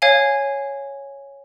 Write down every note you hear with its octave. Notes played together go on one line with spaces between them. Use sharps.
C#5 F5 G#5